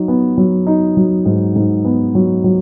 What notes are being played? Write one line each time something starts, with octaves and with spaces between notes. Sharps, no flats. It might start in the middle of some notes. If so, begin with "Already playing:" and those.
Already playing: F#3 D#4
B3
F#3
D#4
F#3
G#2
G#2
B3
F#3
F#3